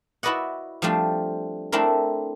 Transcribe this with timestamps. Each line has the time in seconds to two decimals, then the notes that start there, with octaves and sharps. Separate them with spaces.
0.23 E4 F#4 B4 D5 D#5 F#5
0.82 F3 G3 A3 C4 D4
1.72 A3 C4 D4 E4 A#4